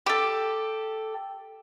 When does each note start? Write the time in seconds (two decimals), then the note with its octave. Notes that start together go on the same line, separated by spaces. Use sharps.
0.06 G4 A4